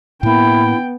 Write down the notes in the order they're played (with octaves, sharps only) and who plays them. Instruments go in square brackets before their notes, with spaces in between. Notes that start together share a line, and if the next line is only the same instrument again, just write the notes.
[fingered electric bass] A2 A#3 [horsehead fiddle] B3 G5 [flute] E4